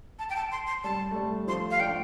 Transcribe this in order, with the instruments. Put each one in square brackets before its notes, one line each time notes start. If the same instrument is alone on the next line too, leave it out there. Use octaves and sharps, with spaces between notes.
[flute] A5
G5
A5
C6
C6
[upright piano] G3 [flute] A5
[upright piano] A3
G3
[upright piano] F3 A3 [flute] C6
[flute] F5
[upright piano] A3 D4 [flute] G5